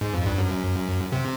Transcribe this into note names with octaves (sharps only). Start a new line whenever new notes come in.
G#2
F2
G2
F#2
C3